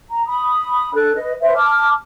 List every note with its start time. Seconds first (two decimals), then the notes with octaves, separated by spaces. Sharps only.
0.09 A#5
0.28 B5 D#6
0.94 D4 A4 F#6
1.15 B4 D#5
1.41 B4 C5 E5
1.56 A5 D6 F6